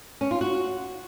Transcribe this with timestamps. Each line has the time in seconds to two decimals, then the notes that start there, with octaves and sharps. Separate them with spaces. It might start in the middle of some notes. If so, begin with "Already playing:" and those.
0.21 C#4
0.31 F4
0.41 F#4